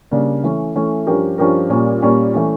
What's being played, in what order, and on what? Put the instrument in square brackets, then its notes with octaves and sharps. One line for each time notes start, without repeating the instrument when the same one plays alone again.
[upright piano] C#3 G3 A#3 D4
E3 A3 C#4
E3 A3 C#4
G2 F3 C#4 G4 A#4
G2 F3 C#4 G4 A#4
A#2 G3 A#3 C#4
A#2 G3 A#3 C#4
E3 A3 C#4